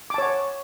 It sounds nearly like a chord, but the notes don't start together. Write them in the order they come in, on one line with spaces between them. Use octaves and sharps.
D6 A5 C#5 F#5